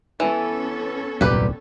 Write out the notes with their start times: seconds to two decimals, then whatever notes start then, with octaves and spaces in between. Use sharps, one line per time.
0.20 E3 B3 C#4 A4
1.21 D#1 C2 F#2 A#2 G4 B4 D5